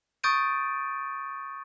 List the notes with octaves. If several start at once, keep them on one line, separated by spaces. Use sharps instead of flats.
C#6 D#6 G6 A6 D7 D#7